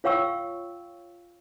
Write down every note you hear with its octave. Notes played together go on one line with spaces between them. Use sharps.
F4 C#5 F5 G5 C#6 E6